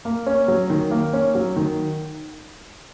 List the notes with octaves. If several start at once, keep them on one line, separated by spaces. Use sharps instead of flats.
A#3
C#4
F#3
D#3
A#3
C#4
F#3
D#3